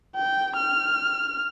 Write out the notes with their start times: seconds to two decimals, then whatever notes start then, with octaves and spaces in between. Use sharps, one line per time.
0.16 G5
0.56 F6